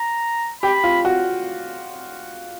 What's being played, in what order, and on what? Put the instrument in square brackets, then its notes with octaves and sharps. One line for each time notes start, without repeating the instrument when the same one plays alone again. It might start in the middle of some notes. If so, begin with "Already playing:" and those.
Already playing: [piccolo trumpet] A#5
[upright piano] G4 [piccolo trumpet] B5
[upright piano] F4
F#4